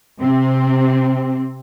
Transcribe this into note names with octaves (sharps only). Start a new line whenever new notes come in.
C3 C4